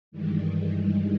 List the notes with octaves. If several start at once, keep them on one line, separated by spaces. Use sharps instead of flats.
G2 D#3 E3 G3 G#3